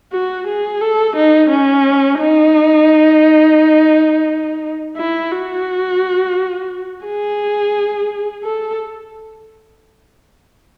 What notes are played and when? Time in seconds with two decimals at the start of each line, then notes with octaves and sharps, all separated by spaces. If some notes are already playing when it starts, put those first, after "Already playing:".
0.12 F#4
0.47 G#4
0.81 A4
1.16 D#4
1.50 C#4
2.20 D#4
4.97 E4
5.31 F#4
7.05 G#4
8.44 A4